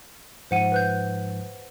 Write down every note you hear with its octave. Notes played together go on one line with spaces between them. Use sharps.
G#2 F3 C5 F#5 D#7
B4 F#6 G6